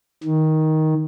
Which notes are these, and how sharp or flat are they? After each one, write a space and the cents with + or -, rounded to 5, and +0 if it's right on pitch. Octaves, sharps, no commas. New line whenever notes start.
D#3 +10